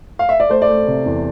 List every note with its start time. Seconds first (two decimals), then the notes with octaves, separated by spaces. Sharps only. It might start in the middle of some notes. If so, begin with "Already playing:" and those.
0.19 F5
0.29 E5
0.40 D5
0.49 A3 C5
0.62 D5
0.69 A3
0.87 C3
1.06 E2